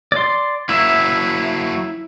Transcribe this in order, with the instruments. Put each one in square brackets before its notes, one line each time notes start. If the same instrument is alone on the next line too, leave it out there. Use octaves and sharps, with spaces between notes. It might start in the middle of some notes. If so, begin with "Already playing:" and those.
[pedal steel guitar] D5 C6
[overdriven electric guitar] F#3 A#3 [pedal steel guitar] E4 E5